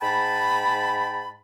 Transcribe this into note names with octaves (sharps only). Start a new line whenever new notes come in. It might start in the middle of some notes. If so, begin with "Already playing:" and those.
G#2 G5 A5 B5